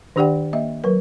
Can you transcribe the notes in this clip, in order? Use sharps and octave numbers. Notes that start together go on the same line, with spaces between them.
D#3 D4 G4 D5 F#5 G5
A#3 D#5 E5
F#3 A#4 B4